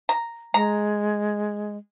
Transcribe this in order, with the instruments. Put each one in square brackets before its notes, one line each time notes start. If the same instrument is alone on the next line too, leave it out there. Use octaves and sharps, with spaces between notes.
[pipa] A#5
[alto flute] G#3 [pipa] A#5